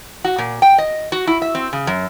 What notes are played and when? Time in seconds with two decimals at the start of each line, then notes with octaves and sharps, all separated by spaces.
0.24 F#4
0.38 A#2
0.62 G5
0.78 D#5
1.12 F#4
1.27 E4
1.42 E5
1.55 C4
1.73 C#3
1.87 F#2